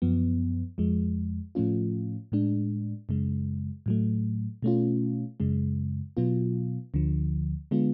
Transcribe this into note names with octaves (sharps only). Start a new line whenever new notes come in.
F#2 F3 B3
F2 F3 G#3
A2 F3 A3 C#4 F4
A2 G#3 D4
F#2 C#3 G#3
A2 F#3 A3
B2 A3 C#4 F4
F#2 C#3 G#3
B2 F#3 B3 F4
D2 D3 F3
D3 G#3 B3 F4